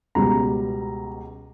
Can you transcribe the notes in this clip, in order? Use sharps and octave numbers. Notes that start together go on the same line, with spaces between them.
C#2 B2 G3 A#5